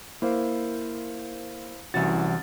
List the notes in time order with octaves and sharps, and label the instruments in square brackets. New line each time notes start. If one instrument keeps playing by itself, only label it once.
[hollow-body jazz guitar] A#3 [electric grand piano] E4 C5 F5
[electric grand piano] C2 A6 [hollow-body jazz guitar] E3 C#4 F#4